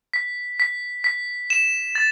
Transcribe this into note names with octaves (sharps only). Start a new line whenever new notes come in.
B6
B6
B6
E7
A6